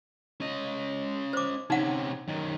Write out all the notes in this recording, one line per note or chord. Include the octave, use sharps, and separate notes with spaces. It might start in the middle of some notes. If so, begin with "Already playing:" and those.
C#4 D#5
C5 D6
C3 C#4 D#4 F#5
F#2 D#3